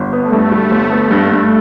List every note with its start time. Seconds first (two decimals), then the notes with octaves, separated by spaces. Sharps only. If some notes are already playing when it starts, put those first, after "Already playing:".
Already playing: G1
0.13 B3
0.22 A3
0.32 G2
0.51 G3
0.71 G1
0.91 B3
1.11 G2
1.31 G2